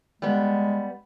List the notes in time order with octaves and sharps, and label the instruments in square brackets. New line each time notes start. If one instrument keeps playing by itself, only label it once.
[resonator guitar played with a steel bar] G3 B3 [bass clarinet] G#3